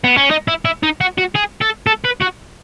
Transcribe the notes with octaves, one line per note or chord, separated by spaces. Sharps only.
B3
C#4
D#4
E4
E4
D#4
F#4
F#4
G#4
A4
A4
B4
F#4